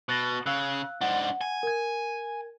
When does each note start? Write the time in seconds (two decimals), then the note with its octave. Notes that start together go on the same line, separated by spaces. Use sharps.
0.09 B2 F#6 A6 A#6
0.46 C#3 F5 E6 F#6
1.01 G#2 D4 F#5
1.41 G#5
1.63 A#4 G#6